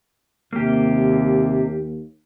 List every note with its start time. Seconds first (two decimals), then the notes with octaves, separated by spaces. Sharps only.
0.53 D#2 C3 A#3 G4